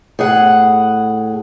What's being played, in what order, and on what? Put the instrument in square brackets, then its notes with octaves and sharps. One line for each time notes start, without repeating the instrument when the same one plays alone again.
[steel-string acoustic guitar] A2 G#4 F#5